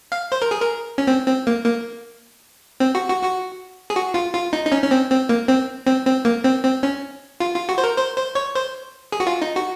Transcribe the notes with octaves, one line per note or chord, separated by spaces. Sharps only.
F5
C5
A#4
G#4
A#4
C#4
C4
C4
A#3
A#3
C4
F#4
F#4
F#4
G#4
F#4
F4
F4
D#4
D#4
C#4
C#4
C4
C4
A#3
C4
C4
C4
A#3
C4
C4
C#4
F4
F4
F#4
C5
A#4
C5
C5
C#5
C5
G#4
F#4
F4
D#4
F#4